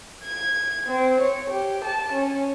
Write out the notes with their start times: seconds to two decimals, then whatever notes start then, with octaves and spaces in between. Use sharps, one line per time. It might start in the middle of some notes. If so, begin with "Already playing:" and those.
0.24 G#6
0.85 C4
1.20 C#5
1.49 G4
1.83 A5
2.13 C#4